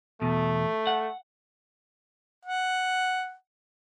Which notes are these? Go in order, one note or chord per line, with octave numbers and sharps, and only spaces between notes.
E2 B2 A3
F#5
F#5